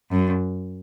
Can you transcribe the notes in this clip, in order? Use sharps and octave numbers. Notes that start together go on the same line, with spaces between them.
F#2